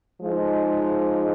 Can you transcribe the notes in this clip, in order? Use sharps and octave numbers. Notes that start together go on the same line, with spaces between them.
F3 G#3 D#4